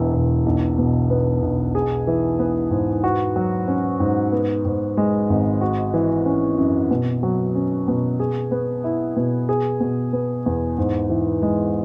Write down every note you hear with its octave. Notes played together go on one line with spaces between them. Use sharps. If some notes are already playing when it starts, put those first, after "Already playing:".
Already playing: E1 E2 E3
E1
B1
B2
B3
B1
G#4
E3
B3
G#2
F#4
F#3
C#4
G#2
B3
G#2
G#3
G#1
F#4
E3
C#4
F#2
B2
F#3
C#4
B2
G#4
B3
E4
B2
G#4
B2
B3
E2
G#2
E3
G#3